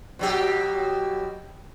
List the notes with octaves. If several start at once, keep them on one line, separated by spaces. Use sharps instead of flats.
B2 F#3 G4